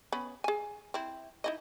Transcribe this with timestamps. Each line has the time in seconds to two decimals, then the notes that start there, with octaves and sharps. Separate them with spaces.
0.12 B3 C#4 B5
0.44 G#4 G#5
0.94 C4 E4
1.44 D#4 E4 D#5